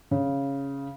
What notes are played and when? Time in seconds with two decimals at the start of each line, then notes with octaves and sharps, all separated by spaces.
0.11 C#3